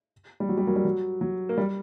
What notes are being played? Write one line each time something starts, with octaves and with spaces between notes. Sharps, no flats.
G3
F#3
G3
F#3 A#3
G3
F#3
F#3
A#3
G3